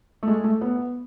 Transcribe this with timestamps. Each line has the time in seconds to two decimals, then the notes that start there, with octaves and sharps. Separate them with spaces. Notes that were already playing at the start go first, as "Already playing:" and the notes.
0.23 A3
0.28 G#3
0.44 A3
0.61 B3